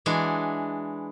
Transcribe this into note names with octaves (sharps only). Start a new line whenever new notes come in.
E3 G#3 D4 F#4